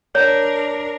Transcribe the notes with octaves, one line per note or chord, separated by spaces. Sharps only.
D4 A#4 C#5